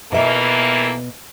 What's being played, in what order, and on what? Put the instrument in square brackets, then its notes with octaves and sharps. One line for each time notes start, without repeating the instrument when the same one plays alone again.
[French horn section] F2 E3 A#3 [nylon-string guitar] B2 E5